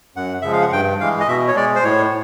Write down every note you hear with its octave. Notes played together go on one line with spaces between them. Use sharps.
F#2 F#5
C#3 F3 G#3 E5
F5
F#5
G2 G5
E3 G#3 F5
D#5
B2 E5
C#5
G#3 D5
C5
A2 C#5